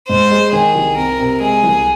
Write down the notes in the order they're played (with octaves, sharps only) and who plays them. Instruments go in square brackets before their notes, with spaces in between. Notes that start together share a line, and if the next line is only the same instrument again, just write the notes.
[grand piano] G#2 [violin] C5
[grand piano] G#3
[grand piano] D#3 [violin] G#4
[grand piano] C2
[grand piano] C4 [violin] A#4
[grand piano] C3
[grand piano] G#3 [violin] G#4
[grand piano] C2